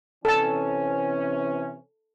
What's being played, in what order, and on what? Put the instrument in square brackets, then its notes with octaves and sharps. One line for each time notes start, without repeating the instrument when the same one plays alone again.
[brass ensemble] C3 E3 C#4 [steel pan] A4 A5